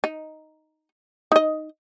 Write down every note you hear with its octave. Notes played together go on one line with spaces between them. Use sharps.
D#4
D#4 D#5